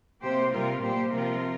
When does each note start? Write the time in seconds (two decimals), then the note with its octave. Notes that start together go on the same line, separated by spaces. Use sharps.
0.22 C3 A#3 G4 C5
0.52 C3 G3 C4 F4 A#4
0.82 A#2 G3 A#3 G4 C5
1.13 C3 F3 C4 F4 A#4